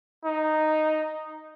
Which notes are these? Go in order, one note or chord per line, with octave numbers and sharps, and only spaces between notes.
D#4